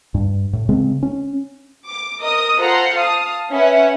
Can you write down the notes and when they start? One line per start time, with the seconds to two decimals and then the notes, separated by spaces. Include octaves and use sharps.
0.14 G2
0.53 A2
0.69 C#3 G#3 C4
1.03 C#4
1.86 D6
2.19 A#4 D#5 D#6
2.58 F4 A4 C5 F#5 A#5 C6
2.95 F5 A5 D#6
3.51 C#4 B4 E5 F#5